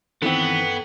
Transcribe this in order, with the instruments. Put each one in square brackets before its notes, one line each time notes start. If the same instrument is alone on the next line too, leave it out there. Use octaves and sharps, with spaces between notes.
[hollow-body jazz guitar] D#3 E3 C4 [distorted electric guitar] B3 [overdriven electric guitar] A4 G5